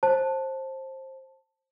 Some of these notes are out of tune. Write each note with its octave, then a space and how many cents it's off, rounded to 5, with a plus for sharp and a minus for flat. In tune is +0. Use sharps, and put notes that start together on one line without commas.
C5 +20 A5 +0